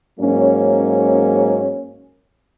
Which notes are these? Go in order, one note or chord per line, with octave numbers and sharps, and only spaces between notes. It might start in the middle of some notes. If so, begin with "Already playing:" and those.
G#2 F#3 A#3 C#4 C#5